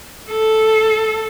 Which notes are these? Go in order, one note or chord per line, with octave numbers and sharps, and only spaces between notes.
A4